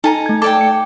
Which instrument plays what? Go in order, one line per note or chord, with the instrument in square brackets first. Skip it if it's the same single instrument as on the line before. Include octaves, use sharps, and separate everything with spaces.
[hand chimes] D#4 [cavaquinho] A4 G#5 A#5
[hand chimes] A3 G#6
[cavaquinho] A4 D5 G5 [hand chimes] D6
[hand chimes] C#7